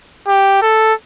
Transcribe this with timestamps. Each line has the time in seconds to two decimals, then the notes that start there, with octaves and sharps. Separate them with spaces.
0.28 G4
0.62 A4